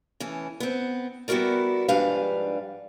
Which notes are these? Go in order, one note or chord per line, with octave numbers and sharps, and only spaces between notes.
E3 A3 C#4
B3 C4
G3 B3 E4 F#4 A#4 D5
G#2 F3 G3 D4 B4 F5